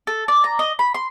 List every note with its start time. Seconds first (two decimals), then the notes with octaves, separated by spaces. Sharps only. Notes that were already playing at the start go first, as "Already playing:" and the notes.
0.07 A4
0.28 D5
0.44 A#5
0.59 D#5
0.79 B5
0.94 C6